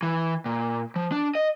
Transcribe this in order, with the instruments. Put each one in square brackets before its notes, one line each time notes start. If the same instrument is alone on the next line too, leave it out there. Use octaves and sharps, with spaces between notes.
[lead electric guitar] E3
A#2
F3
D4
D#5